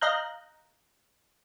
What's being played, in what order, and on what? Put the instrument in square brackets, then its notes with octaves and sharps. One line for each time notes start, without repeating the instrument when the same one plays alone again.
[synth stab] D#5 F5 A#5 F#6 G6